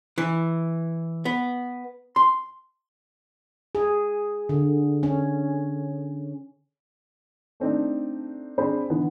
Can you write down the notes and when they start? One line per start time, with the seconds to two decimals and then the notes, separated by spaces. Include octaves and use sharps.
0.18 E3
1.25 B3
2.16 C6
3.75 G#4
4.49 D3
5.03 C#4
7.60 A3 C4 D4 D#4
8.58 C4 D4 G#4 C5 B5
8.90 D3 E3 B3